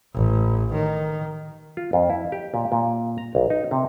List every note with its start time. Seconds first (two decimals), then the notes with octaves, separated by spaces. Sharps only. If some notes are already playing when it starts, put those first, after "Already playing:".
0.14 A1
0.72 D#3
1.77 F4
1.93 F2
2.10 E4
2.32 G4
2.54 A#2
2.72 A#2
3.18 A#5
3.35 B1
3.50 D#4
3.71 C3